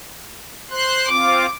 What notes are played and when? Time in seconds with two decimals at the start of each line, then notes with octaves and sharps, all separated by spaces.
0.71 C5 C6 F#6
1.09 C4 F4 D6